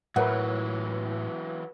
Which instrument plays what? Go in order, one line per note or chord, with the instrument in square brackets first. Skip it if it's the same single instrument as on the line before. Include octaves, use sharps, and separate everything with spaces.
[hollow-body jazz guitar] A2 [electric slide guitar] E3 F#3 [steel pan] A#4 B4 F#5